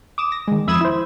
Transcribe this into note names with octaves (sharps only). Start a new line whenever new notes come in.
D6 D#6 E7
A#6
D#3 G#3
F2 E5 B5 D#6 G#6 E7
E4 C5